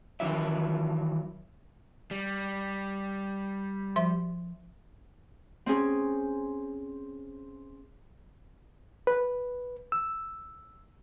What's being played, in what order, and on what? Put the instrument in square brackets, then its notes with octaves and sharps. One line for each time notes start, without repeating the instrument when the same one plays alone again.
[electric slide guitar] D#3 E3 F#3 E5
[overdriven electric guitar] G3
[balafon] F3 E5 C6
[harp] C4 C#4 G#4
[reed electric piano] B4
E6